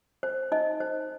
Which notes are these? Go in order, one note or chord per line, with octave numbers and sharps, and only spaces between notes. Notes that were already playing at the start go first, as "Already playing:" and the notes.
C5
D#4 D#5
C5